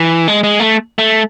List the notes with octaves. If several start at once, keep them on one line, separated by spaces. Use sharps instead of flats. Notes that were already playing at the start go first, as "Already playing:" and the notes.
Already playing: E3
G#3
G#3
A3
A3